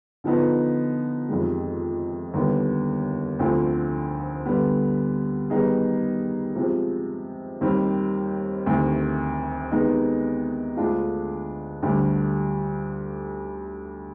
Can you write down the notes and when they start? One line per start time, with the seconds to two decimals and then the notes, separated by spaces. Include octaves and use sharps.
0.24 D3 F3 B3 D#4
1.29 F2 C3 D#3 G#3
2.34 D#2 D3 G3 B3
3.39 D2 D3 F3 C4
4.46 D3 G3 B3
5.50 D#3 G3 B3 D#4 G#4
6.55 C3 F3 G#3 C4
7.61 D#2 D#3 G3 C4
8.66 D2 C3 D#3
9.71 C3 D#3 G#3 B3 D#4
10.77 D2 D3 G#3 D4 F4
11.82 D2 D3 G3 D4 G4